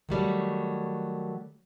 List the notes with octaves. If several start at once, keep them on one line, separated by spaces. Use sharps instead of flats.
D#3 F#3 G3 A3